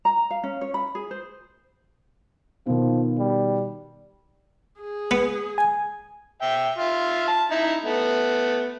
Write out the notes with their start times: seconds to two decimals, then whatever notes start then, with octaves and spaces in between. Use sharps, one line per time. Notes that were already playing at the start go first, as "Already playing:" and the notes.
0.05 A#5
0.31 F5
0.44 C#4
0.61 C#5
0.74 B5
0.95 G#4
1.11 C5
2.66 B2 D#3 F3
3.19 G3
4.81 G#4
5.11 B3
5.58 G#5
6.41 E5 G5
6.78 F4 E5
7.28 A5
7.51 D#4 E4
7.84 A3 B3